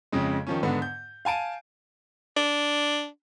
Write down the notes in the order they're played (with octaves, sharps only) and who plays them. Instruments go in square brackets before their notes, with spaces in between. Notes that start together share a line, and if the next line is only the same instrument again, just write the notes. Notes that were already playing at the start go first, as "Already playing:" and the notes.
[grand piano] F2 C#3 G#3
D#3 F3 C#4
G#2 D3 B3
G6
F5 G#5 A5 D7 D#7
[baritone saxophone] D4